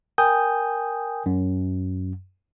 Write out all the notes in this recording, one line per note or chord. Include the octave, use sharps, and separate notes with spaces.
A#4 G5 G#5 D#6 G6
F#2